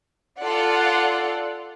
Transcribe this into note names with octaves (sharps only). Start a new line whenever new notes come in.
F4 A4 D5 F#5